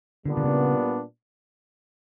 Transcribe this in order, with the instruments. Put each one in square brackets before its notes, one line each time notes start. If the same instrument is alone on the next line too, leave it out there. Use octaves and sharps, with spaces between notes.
[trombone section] A#2 G3 B3 D4 [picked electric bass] D3
[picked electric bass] D3
C#3